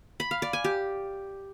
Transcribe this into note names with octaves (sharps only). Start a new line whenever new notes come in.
B5
F5
D5
G#5
G4